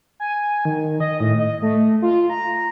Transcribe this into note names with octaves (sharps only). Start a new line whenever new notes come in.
G#5
D#3
D#5
A2
D#5
A3
F4
A#5